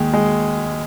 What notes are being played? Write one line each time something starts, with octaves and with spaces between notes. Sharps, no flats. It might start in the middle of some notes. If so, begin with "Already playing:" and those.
Already playing: D#2 G#3
G#3